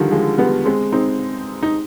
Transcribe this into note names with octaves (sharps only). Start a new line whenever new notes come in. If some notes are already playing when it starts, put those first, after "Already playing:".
Already playing: D3 D#3 F3 G3
F3 G#3
G3 B3
G#3 C4
C4 D#4
D#4